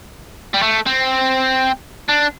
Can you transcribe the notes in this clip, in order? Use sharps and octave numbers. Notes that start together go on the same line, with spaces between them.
G3
A3
C4
D4